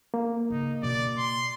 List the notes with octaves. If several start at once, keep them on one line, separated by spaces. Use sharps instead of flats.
A#3
C#3 D#4
B2 D4 D5
C6